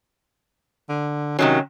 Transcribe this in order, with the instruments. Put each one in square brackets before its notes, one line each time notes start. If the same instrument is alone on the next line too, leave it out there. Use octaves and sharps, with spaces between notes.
[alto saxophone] D3
[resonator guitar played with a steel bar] C3 D#3 F#3 [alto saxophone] C#4